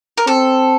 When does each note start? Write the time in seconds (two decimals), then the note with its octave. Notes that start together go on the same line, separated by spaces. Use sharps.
0.18 A#4
0.27 C4 A4